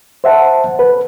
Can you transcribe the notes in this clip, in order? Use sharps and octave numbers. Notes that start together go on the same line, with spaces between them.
C5 E5 F#5 A5
B4